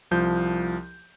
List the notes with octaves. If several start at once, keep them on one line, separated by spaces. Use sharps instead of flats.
C2 F3 G6